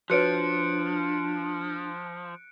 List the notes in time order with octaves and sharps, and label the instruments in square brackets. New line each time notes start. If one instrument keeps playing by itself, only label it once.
[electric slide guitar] F3 [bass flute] D4 [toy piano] F#4 B4 C#5 [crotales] F#6 C#7 D7